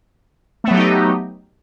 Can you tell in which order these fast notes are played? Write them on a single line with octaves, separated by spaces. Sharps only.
A3 B3 F#3 G4 D#4